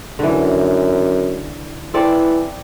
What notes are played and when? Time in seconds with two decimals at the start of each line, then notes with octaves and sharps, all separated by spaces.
0.19 F#2 D3 E3
1.94 E3 C4 A4 D5